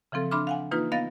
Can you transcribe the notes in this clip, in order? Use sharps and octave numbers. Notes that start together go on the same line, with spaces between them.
C#3 E3 F3 C4 A4
D4 E5 B5 C6 D6 F6
F5 F#5 G#5
E3 A#3 D#4 F4 B4
B3 D#5 F5 A6 A#6